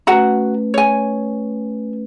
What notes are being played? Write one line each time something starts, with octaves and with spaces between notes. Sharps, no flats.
A3 C#4 F#4 B4 F#5 A#5
C#5 G#5